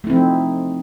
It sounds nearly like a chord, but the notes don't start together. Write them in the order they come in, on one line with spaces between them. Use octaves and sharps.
A3 E4 C4 F3 D#4